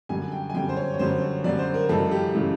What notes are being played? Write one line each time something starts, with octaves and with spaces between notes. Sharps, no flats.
F#2 D3 G3 G#5
G5
G#5
F#2 D3 G3 G5
C5
C#5
C#5
F#2 D3 G3 C5
C#5
F#2 D3 G3 D5
C5
A#4
F#2 C#3 E3 G#3 A4
G4
C#3 E3 G#3